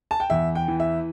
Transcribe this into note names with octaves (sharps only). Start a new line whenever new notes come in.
A5
G5
E2 E5
G5
E3
E5